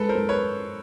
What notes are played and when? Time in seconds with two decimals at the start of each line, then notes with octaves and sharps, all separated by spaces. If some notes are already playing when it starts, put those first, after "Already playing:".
Already playing: G#3 A4 B4
0.09 A#4 C5
0.15 G#3
0.29 B4 C#5